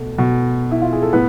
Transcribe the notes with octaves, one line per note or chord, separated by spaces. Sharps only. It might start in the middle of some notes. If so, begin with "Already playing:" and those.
Already playing: B2 A3
B2
E4
F4
G#4
A4
A2 B3 B4